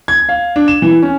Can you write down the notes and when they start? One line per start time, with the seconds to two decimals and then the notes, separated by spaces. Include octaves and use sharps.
0.08 G#6
0.29 F5
0.56 D4
0.68 E7
0.82 E3
1.03 C#4